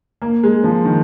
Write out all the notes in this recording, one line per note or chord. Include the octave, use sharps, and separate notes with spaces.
A#3
G#3
F3
D#3